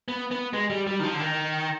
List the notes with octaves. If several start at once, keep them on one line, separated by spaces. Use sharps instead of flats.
B3
B3
G#3
G3
G3
D#3
F3
D3
D#3